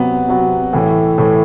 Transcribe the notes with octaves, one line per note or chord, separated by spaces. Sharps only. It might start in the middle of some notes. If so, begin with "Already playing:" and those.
Already playing: C3 F#3 B3
C3 F#3 B3
A2 E3 A3
A2 E3 A3